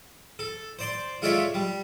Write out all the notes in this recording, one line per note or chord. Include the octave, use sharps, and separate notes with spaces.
A4
C5 D5 C6
G#3 F4 A4 C#5 D5 E5
G3